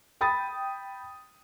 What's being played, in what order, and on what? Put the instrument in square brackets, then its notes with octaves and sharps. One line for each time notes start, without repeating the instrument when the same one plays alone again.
[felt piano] G5 B5 D#6 A6